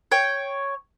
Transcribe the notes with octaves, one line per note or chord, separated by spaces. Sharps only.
C#5 G5